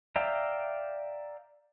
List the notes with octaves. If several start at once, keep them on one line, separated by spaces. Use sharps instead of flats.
D5 E5 F5 G5 A#5